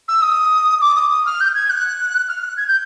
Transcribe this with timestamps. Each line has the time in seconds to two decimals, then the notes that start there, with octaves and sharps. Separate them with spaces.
0.08 E6
0.22 D#6
0.81 D6
0.95 D#6
1.11 D#6
1.26 F6
1.41 G6
1.55 G#6
1.70 F#6
2.28 F6
2.43 F#6
2.57 G#6
2.68 G6